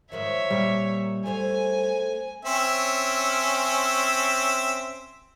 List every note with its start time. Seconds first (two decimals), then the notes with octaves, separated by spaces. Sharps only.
0.12 G#2 D#3 F3 C#5 E5
0.51 A#2 G3
1.26 A3 C5 C#5 G#5
2.45 C4 C#4 E5